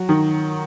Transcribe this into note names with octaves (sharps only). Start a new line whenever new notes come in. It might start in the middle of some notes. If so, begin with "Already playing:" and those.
Already playing: F#3 F#4
D#3